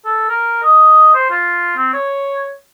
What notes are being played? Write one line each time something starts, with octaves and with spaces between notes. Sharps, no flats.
A4
A#4
D#5
C5
F4
C4
C#5